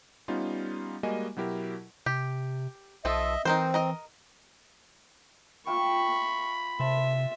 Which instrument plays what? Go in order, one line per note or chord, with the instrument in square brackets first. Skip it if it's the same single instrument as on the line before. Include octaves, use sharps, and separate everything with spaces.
[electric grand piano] G3 B3 C#4 D#4 F4
G3 G#3 A#3 F#4 D#5 G#5
B2 F#3 E4 G4 A#4
[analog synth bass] C3 [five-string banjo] G4
[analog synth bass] B1 [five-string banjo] F3 F4 A4 [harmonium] D#5 E5
[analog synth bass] E3 [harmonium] C4 [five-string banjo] D#4 A#4 C5
[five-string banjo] A#4 D#5 A#5
[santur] F4 E5 G5 [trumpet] B5 [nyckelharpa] C#6
[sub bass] C3 [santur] C5 A5 [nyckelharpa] E5